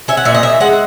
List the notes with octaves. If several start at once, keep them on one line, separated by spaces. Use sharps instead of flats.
C#4 E5
F#5
A#2 E5
D#5
A#2 E5
G#3 F#5